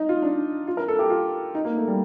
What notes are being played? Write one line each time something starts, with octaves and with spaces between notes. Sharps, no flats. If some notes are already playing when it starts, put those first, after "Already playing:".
Already playing: D#4
F4
D4
F4
A#4
A4
G4
F4
D#4
A#3
A3
G3